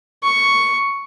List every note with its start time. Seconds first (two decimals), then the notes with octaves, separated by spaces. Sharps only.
0.24 C#6